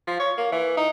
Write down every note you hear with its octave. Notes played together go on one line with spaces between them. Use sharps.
F3
C#5
A#3
E3
D#4